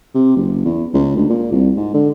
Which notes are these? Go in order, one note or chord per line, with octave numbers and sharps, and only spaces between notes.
C3
F#1
E2
C#2
D2
A#2
C2
G#2
D3